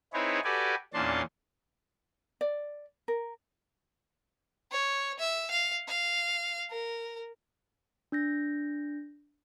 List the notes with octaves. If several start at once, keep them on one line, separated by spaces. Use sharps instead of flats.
C4 D#4 E4 G#4 B4 C#5
F#4 G4 A4 B4 D5 G#5
E2 A#2 C#4 D4 A5 C6
D5
A#4
C#5
E5
F5
F5
A#4
D4 G6 A#6